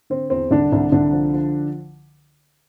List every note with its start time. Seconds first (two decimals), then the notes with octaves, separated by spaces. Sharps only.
0.10 D3 C4
0.30 E2 C4
0.51 C2 D3 D4
0.73 C2
0.92 C2 D3 D4
1.13 F3
1.33 F3